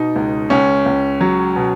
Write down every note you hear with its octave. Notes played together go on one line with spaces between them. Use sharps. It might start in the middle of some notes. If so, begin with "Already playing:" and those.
Already playing: B2 D#4
C#2
C#2 C#4
C#2
F#3
B2